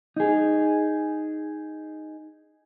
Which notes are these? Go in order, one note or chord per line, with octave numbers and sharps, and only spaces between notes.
D#4 G#4